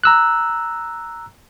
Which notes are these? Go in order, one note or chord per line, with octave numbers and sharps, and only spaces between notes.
A#5 E6 F#6